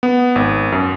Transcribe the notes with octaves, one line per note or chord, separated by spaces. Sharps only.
B3
G#1
F#2